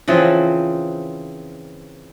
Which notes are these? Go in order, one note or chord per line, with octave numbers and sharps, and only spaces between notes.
C#3 E3 F3 C4